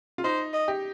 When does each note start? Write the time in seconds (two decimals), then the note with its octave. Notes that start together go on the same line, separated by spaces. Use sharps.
0.18 F4
0.24 D#4 C5
0.53 D#5
0.68 G4